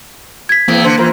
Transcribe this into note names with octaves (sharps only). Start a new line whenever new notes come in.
G#6 B6
E2 E3 A#3 C4
D3 C5
E3 F3 A#4 C5